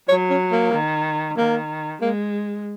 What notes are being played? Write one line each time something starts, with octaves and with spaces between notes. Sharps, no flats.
F#3 C#5
C#4
A#3
D#3
D#3 A#3
G#3 A#3